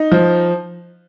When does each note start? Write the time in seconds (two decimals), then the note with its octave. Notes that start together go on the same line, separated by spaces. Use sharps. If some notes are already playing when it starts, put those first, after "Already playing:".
Already playing: D#4
0.12 F3